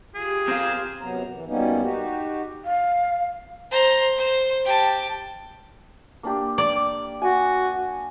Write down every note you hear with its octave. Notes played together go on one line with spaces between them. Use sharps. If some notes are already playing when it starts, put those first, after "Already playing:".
F4 G4 G#4
C4 A#4 C5 F5
F#2 C3 F#3 B3 A#5
E3
F#2 G3 A#3 B3 C#4 D#4
D#4 F#4 G4
F5
C5 A#5
C5
G4 A5
A#3 D4 G4
D5
F#4 G#5